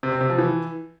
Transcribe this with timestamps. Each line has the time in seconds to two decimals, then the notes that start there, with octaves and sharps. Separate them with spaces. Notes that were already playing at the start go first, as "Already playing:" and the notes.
0.03 C3
0.12 C4
0.21 C3
0.30 F3
0.38 E3